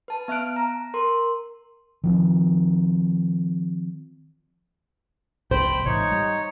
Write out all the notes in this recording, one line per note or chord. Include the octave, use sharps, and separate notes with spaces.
B4 A5
B3 E5 F6 F#6 D7
A#5
A#4 C6
D#3 F3 C4
F1 C2 B2 C5 G5 B5
G#1 A#2 E3 D#4 C#5
G3